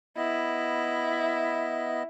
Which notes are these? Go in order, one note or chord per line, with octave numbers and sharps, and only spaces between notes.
B3 E4 D#5